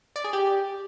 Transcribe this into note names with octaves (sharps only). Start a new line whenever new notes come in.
D5
G#4
G4